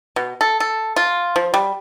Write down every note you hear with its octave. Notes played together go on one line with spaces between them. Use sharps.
B2
A4
A4
F4
F3
G3